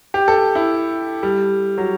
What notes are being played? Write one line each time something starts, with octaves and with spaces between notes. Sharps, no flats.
G4
A4
E4
G3
F#3